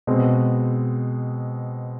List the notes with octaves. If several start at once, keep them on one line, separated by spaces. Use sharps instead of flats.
B2 G#3 C4